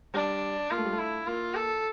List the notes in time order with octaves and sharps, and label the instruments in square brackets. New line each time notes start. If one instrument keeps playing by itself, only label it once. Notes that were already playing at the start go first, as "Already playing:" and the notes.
[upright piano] G3 [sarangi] D4
[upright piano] A#3 [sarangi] F4
[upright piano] A3
G3
A3
[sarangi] E4
[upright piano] A#3 [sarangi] F4
[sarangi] A4